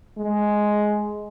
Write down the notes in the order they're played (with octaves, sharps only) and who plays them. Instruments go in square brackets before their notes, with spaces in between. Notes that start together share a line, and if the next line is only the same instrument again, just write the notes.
[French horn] G#3